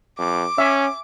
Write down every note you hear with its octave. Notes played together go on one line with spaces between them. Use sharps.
F2 D6
C#4 E5 G#5